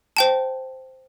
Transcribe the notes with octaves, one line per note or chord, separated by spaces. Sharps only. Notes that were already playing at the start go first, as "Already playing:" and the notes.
C5 G5 A5